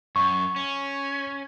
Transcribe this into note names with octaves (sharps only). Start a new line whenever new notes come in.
F#2 C#6
C#4